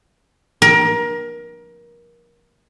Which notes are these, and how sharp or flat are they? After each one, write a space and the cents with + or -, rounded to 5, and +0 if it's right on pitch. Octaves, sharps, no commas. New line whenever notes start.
A#4 +25